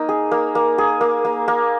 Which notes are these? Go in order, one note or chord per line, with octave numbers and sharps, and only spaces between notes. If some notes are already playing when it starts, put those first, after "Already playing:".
Already playing: A#3 D#4
G#4
A#3
A#3
G#4
A#3
A#3
A#3